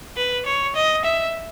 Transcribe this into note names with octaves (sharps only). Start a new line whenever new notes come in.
B4
C#5
D#5
E5